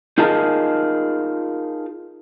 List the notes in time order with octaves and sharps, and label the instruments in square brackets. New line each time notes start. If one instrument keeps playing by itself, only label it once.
[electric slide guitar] D#4 F4 G#4 A#4 D#5 A5